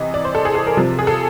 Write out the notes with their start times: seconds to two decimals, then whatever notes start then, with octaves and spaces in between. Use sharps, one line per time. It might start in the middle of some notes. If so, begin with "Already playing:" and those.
Already playing: C3 E3 D#5
0.14 D5
0.25 C5
0.35 A4
0.45 G#4
0.55 A4
0.67 A#4
0.77 C3 F3
0.99 G#4
1.07 A4